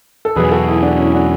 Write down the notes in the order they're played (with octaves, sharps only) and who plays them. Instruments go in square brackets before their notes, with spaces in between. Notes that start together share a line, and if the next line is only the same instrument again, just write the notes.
[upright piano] A4
[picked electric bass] E2 B2 F#3 [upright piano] G#4 B4
[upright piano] F#4 A4
E4 G#4
D4 F#4
C#4 E4
D4 F#4